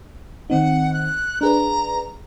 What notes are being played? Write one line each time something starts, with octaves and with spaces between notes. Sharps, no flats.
D#3 C4 D#4 F#5
F#6
D4 G#4 B4 A#5